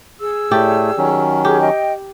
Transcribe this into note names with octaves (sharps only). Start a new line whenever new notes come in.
G#4 E6
A2 A3 G4 D5
D#3 F#3 C#4
G4 G#4
D#5 G5